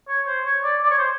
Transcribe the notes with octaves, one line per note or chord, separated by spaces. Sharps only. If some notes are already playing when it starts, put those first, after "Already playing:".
C#5
C5
C#5
D5
D5
C#5
C5